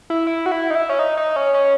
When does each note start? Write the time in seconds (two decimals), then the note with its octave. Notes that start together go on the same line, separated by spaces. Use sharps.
0.10 E4
0.27 E4
0.46 F#4
0.52 E4
0.71 D#4
0.75 E4
0.89 C#4
0.99 D#4
1.17 D#4
1.36 C#4
1.54 C#4